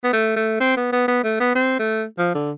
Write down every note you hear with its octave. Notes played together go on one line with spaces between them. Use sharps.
B3
A3
A3
C4
B3
B3
B3
A3
B3
C4
A3
F3
D3